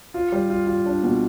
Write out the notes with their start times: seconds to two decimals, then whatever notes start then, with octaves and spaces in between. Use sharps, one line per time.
0.14 F4
0.32 G3
0.50 F4
0.67 F4
0.86 D4
1.03 B2